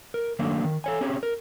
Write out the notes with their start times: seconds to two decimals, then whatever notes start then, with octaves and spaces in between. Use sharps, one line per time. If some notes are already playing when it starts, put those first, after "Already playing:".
0.14 A#4
0.39 D#3 F#3 A3 A#3 D4
0.64 D#3
0.84 A4 C#5 G#5
1.01 C4 C#4 G4 G#4 C#5
1.23 A#4